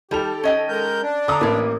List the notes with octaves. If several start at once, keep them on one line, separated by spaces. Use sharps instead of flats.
D#3 G3 G4 A4 F7
C#4 D#5 G5
G#3 A#4 G6
D4
D3 A#5 D6 D#6
A1 E3 A#3 B4